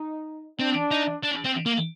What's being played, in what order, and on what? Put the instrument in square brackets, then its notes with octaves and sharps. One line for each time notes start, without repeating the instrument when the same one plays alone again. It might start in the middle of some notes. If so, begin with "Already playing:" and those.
Already playing: [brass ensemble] D#4
[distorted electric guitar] C4 [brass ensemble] D4
[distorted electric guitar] D#4
D4
C4
A#3